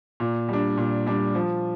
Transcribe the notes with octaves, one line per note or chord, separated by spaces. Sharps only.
A#2
G3 D4
A#2
G3 D4
F3